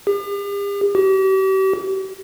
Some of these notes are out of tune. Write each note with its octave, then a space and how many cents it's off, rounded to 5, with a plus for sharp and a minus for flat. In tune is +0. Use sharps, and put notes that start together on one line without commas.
G4 +45
G4 -40